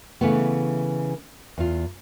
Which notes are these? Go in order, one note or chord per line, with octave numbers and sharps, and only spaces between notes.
C#3 E3 A3 B3
E2 F4